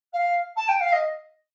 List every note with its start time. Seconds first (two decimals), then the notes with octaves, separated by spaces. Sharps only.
0.13 F5
0.56 A5
0.68 G5
0.80 F5
0.92 D#5